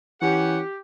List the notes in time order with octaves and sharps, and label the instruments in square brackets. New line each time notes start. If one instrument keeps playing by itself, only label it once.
[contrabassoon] E3 [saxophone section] C#4 F#5 [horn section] G4